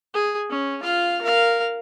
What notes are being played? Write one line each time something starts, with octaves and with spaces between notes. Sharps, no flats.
G#4
C#4
F4 F5
A#4 F5